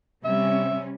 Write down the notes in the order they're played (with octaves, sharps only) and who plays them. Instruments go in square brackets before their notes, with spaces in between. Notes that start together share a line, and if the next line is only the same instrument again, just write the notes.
[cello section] C3 G3 C#4 [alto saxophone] E5